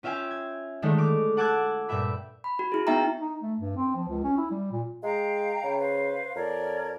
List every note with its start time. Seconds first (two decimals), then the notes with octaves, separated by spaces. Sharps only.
0.03 C#4 F4 E5 F5 G5 G#5
0.31 G#6
0.82 D3 D#3 G#3 A3 D#4
0.98 D6 F6
1.37 F#5 A5 D6 E6 F#6 G#6
1.89 G2 A#2 G4 E5 B5
2.44 B5
2.59 F#4
2.72 E4 G#4
2.87 B3 D#4 E5 G5 A#5
3.20 D#4
3.42 A3
3.59 G2
3.76 C4
3.95 F3
4.08 C#2
4.24 C#4
4.37 E4
4.51 G3
4.72 A#2
5.03 G#3 F5 G5 A#5
5.63 C#3
5.80 B4 C5 F5
6.36 F2 A#4 C#5 D5